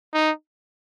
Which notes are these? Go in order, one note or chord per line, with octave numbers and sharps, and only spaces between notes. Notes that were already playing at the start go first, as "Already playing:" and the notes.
D#4